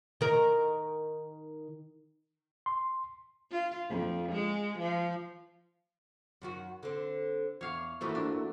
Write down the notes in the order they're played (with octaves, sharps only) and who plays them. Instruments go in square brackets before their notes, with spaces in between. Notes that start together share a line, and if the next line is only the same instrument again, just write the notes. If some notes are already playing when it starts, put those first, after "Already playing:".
[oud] D#3 A#4
[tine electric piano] C6
[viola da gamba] F4
F2
G#3
F3
[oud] F#2 D#3 F#4
D3 C4
[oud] E2 [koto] C#5 F5
[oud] G2 E3 F3 [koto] A3 [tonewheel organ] A#3 E4 F#4
[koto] D4